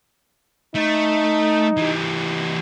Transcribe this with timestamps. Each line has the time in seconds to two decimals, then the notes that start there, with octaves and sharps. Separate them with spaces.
0.75 A3 D#4
1.77 E3 G3